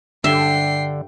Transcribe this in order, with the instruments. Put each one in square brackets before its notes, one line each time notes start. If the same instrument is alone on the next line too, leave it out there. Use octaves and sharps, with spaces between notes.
[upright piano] G2 A4 G7 [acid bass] D3 [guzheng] E5 [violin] G5 C7